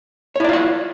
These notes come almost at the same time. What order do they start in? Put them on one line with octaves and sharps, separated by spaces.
C#5 E4 D5 F4 F#5